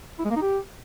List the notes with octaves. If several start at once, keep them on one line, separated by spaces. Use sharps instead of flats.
E4
G#3
A#3
D#4
G4